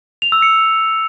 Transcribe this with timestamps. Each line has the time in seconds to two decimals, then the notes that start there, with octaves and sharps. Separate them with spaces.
0.22 F7
0.32 E6
0.42 C#7